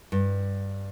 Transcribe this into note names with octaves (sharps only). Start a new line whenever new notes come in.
G2